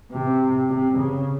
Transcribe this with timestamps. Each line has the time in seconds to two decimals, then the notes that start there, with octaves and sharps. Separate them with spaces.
0.12 C3
0.69 C3
0.97 C#3